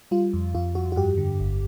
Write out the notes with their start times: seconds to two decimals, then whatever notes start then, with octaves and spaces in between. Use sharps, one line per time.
0.11 G3 F4
0.33 F2
0.54 F2 F4
0.75 F2 F#4
0.92 F#4
0.96 G2 G4
1.18 D3
1.40 G1